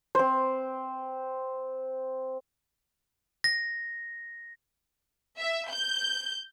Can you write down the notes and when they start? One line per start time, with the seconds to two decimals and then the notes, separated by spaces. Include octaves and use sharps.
0.15 C4 C5
3.44 A#6
5.39 E5
5.70 G6